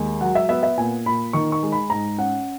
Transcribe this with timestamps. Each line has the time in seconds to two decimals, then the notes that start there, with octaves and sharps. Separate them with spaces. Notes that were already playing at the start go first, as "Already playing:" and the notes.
Already playing: D#2 G#3
0.21 F#3 F#5
0.35 E5
0.49 B3 E5
0.63 E5
0.77 A#2 G#5
1.06 A#2 B5
1.33 D#3 C#6
1.52 C#6
1.63 G#3
1.72 B5
1.90 G#2 A#5
2.18 C#4 F#5